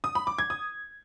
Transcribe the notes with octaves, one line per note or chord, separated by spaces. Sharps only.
D#6
B5
D6
G#6
D#6